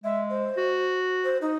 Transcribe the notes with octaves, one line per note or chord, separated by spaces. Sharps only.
G#3 E5
C5
F#4
C5
D#4